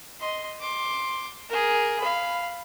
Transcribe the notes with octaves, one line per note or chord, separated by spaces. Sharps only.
D#5 C6
C6 D6
G#4 A#4
F5 B5